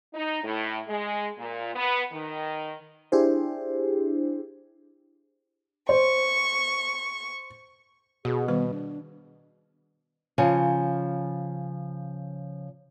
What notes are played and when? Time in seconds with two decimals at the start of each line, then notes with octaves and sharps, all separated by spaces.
0.14 D#4
0.44 A2
0.88 G#3
1.38 A#2
1.76 B3
2.12 D#3
3.12 D4 E4 G4 G#4 C5
5.89 C5 C#6
8.25 B2 F#4 G#4
8.48 D#3 G3 B3 B4
8.70 D4
10.38 C#3 F3 C#5 G#5